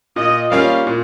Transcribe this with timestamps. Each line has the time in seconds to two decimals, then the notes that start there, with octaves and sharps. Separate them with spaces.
0.16 A#2 D#5
0.51 G3 A#3 C#4 F4 F5
0.87 A#2